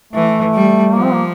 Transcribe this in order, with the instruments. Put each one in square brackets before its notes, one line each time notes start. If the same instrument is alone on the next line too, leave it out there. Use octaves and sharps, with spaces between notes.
[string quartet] E3 [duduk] A3
[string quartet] G3
[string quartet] F3 [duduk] A#3
[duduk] C4
A#3